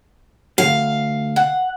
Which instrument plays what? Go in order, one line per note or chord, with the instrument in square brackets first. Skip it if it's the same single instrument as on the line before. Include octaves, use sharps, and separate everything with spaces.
[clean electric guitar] D2 [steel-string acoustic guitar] F5
[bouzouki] F#5